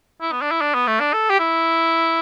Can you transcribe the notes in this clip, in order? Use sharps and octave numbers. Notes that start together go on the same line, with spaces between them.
E4
B3
D4
E4
D4
B3
A3
D4
A4
G4
E4